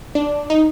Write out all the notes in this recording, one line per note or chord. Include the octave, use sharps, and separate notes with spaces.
D4
D#4